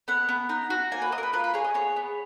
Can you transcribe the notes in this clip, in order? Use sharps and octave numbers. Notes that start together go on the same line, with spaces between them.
B3 F#5
B3
D#4
F#4
A#3 G#5
B4
A#3 D#5
A#4
B4
F4 B4
B4
G#4 C#5
D#5
B3 C#5
B3